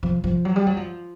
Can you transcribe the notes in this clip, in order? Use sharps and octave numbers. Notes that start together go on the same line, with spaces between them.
F3
F3
F#3
G3
F#3
F3